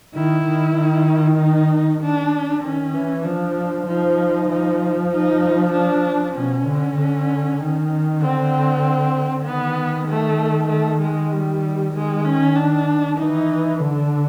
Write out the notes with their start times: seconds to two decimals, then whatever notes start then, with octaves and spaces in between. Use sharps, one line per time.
0.15 D#3 E4
0.45 D#3
0.77 D#3
1.39 D#4
2.00 D4
2.63 D#3 C#4
2.94 E3
3.24 F3 D4
3.87 F3 D#4
4.49 F3
5.11 D#4
5.73 D4
6.35 B2 C#4
6.66 D3
6.97 D3
7.60 D#3
8.21 D3 C4
9.46 D#3 B3
10.08 A3
10.70 A3
11.01 G#3
11.32 G3
11.94 D#3 G#3
12.25 C#4
12.56 D4
13.18 E3 D#4
13.80 D3 D4